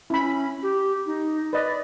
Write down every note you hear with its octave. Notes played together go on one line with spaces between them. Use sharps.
C#4 E4 B5
G4
D#4
B4 D5 D#5